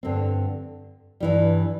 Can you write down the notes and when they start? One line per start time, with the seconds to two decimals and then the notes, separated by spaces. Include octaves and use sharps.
0.03 G2 D3 C4
1.20 G2 E3 G3